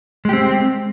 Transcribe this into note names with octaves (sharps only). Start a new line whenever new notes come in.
G#3 C4 G4